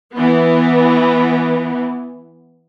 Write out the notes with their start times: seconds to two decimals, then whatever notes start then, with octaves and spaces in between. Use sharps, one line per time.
0.14 E3 B3